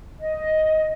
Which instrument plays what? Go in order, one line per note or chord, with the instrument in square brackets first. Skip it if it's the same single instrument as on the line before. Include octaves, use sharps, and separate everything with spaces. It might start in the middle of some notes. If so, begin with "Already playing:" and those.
[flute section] D#5